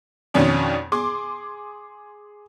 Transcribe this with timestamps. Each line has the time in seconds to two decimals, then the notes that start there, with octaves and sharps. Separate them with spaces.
0.34 F2 B2 D#3 C#4 D4
0.92 G#4 C6 D6